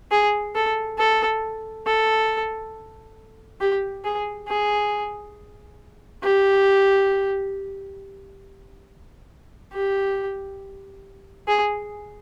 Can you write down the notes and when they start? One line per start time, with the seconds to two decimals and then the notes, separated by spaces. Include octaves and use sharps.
0.12 G#4
0.55 A4
0.99 A4
1.87 A4
3.61 G4
4.04 G#4
4.48 G#4
6.24 G4
9.74 G4
11.48 G#4